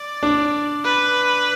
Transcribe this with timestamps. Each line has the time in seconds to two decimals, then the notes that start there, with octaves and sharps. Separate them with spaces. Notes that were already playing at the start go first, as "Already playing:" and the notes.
Already playing: D5
0.23 D4
0.84 B4